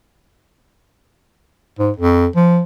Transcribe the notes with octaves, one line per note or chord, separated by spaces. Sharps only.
G#2
F2
F3